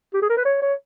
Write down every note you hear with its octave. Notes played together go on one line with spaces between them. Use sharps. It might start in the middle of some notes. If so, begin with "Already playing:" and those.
G4
G#4
A#4
B4
C#5
C#5